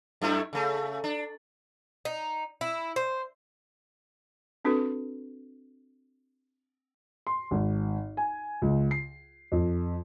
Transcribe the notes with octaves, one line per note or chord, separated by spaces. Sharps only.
F#2 A3 E4
C#3 A3
D4
D#4
E4
C5
C4 D4 F#4 A4 B4
C6
G#1
G#5
C#2
C7
F2